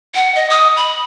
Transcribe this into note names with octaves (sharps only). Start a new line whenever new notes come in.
F#5
D#5
D#6
B5